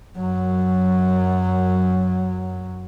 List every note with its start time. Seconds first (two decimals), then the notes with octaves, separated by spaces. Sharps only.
0.17 F#2 F#3